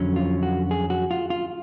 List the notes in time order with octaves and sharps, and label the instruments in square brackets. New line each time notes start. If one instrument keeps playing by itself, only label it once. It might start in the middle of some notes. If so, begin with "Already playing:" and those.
Already playing: [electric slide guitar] F2 D3 F#3 C#4
F4
F#4
G#4
F#4
F4
F4